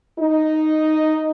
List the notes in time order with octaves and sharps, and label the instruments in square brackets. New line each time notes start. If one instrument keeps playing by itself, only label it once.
[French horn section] D#4